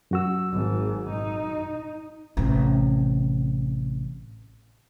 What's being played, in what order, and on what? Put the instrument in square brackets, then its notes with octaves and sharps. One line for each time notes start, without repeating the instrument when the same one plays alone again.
[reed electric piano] F#2 F#4 E6
[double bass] G#1 G#2
D#4
[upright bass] A1 C3